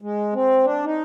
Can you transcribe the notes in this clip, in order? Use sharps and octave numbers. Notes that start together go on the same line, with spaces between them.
G#3
C4
D4
D#4